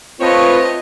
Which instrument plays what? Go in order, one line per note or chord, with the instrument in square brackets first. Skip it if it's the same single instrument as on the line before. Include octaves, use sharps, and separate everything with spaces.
[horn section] A3 C#5 [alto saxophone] C4 [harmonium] F4 B4 [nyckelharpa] D#5